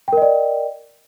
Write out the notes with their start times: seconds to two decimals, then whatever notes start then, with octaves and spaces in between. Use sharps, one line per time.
0.08 G5
0.13 A#4
0.17 D#5
0.22 D5